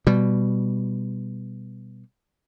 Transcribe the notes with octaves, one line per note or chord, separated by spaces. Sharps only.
B2 G3